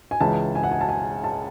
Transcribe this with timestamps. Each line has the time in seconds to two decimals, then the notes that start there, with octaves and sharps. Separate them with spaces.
0.11 G#5
0.20 C#2 C#3 E3 A5
0.55 G#5
0.63 F#5
0.72 G#5
0.81 A5
0.89 G#5
1.24 A5